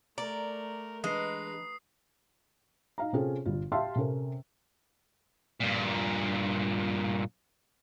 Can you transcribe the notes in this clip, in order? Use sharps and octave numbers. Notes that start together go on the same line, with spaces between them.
A3 A#4 D5 A#5
E3 G#3 D4 B4 D#5 A#5 D#6 C7
D#4 F5 A#5
C3 C4 C#4 F4 G#4 A4
G1 G3 F4
G4 E5 F5 G5 A5 C6
C3 C#4 A4 A#4
G2 A#2